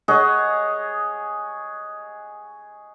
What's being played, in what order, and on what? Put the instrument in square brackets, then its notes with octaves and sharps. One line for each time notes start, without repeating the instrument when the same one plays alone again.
[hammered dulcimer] G#4 C#5 D#5 F#5